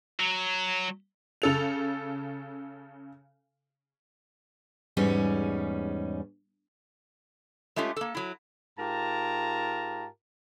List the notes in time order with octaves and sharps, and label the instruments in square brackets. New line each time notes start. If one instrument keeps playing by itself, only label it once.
[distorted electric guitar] F#3
[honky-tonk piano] C#3 A4 F7
[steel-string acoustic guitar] E2 G#2 G3 C#4 D#4
[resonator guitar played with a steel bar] G#3 A3 C#4 F4 G4
A#3 A4
F#3 E4
[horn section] G#2 F4 G4 A#4 A5 A#5